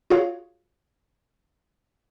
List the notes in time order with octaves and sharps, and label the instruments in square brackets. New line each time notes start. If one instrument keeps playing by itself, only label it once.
[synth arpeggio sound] F4 F#4 G#4 C#5 F5